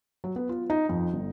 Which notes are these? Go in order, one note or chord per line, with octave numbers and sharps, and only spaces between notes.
F#3
B3
F4
D#4
F2
G1